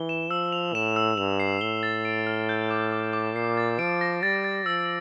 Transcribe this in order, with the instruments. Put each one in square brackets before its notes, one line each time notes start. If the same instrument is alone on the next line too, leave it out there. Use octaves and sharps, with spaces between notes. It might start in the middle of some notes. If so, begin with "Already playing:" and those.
Already playing: [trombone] E3 [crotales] G7
[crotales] E7
[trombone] F3 [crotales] E6
[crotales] F7
[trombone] A2 [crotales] E7
[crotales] E6
[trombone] G2 [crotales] F7
[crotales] C7
[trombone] A2 [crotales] G7
[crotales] A6
D7
F6
G6
D6
D6
D6
[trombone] A#2 [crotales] C7
[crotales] A6
[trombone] F3 [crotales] D7
[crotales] A#6
[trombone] G3 [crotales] A6
[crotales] A6
[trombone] F3 [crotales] E6